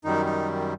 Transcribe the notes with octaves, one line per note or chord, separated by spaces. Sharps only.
F#2 D#3 G3 D#4
D#4